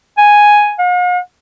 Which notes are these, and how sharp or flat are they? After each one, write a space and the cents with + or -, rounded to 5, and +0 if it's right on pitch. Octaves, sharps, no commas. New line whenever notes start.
G#5 +0
F5 +45